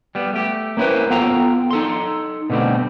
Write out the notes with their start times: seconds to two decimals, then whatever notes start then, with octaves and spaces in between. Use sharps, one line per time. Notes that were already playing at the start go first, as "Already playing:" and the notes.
0.15 G3 B3
0.33 A3 G4
0.77 A#3 C#4 E4 G4 B4 C5
1.10 B3 F4 A4 F5 G5 A#5
1.71 D#4 A4 C6
2.50 B2 D3 G3 A3 C4